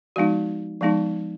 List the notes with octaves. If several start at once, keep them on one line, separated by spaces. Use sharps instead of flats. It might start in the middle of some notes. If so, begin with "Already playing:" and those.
F3 G#3 B3 D#4 F#4
F3 G#3 B3 D#4